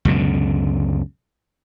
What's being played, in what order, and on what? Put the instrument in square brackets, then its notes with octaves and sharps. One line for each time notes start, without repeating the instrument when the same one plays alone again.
[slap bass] C#2 F#2 B2 D3